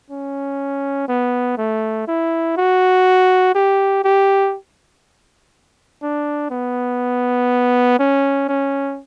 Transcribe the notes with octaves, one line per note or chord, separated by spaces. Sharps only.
C#4
B3
A3
E4
F#4
G4
G4
D4
B3
C#4
C#4